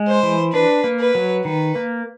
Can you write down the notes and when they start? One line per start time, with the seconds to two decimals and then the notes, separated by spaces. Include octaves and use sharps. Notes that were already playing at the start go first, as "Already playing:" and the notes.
Already playing: G#3
0.08 C5
0.23 E3
0.53 D4 B4
0.84 A#3
1.00 B4
1.15 F#3
1.45 D#3 B4
1.75 A#3